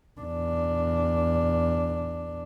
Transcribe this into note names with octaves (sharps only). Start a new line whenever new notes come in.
E2 D4